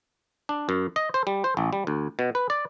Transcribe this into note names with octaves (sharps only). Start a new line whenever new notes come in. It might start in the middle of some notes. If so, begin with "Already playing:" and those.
D4
F#2
D#5
C5
G3
C5
A1
G3
D2
B2
B4
D5